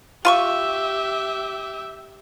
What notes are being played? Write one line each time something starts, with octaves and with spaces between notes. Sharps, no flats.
F4 G4 E5 C6 C#6